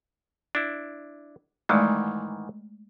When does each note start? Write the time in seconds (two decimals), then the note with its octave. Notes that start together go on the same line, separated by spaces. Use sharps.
0.55 D4 E4
1.69 G#2 D#3 E3 G#3 A3 D5